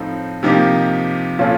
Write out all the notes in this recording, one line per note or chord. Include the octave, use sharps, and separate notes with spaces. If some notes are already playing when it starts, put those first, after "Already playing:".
Already playing: A2 F3 A3 C4 D#4
C3 F3 A#3 D#4 G4
A#2 F3 A3 C#4 F4